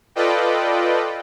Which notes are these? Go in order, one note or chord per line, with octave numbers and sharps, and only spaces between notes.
F4 A4 B4 D5 D#5 G5